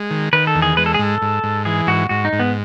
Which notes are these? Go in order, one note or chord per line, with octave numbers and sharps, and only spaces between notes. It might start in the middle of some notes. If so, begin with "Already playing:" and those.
Already playing: G#3
D#3
D#3 B4
A4
E2
G#4
G#3 B4
A4
G#4
G#2 A4
G#2
G#2
E3 G#4
G#2 F#4
G#2 F#4
D#4
G#2
B3